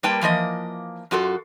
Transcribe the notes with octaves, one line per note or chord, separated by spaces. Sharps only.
G3 A#3 B4 G5 A5
E3 F3 A#3 D#5
F#2 F4 F#4 A4